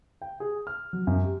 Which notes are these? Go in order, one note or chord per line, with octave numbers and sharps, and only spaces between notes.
G5
G#4
F6
F#3
F#2
G4